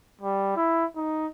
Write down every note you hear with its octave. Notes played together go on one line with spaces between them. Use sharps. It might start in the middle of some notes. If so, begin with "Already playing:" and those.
G3
E4
D#4